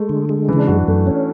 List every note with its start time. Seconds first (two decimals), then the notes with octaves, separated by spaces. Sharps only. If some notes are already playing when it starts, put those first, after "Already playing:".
Already playing: G#3 A3
0.09 D3
0.29 G#3
0.49 C#3 E3
0.58 D4
0.67 F#2 F#4
0.88 F#2 A3
1.07 C#4